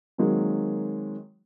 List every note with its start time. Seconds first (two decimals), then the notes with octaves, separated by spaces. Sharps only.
0.18 D#3 F#3 G#3 A#3 C4